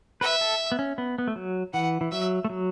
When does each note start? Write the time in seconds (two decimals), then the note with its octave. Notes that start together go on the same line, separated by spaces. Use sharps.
0.21 B4 E5
0.41 A4
0.72 B3
0.79 C#4
0.98 B3
1.18 B3
1.28 A3
1.36 F#3
1.74 E3 F#5
2.01 E3
2.12 F#3 E5
2.45 A3
2.50 F#3